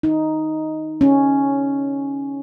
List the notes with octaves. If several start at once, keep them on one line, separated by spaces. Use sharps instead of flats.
D#4
C#4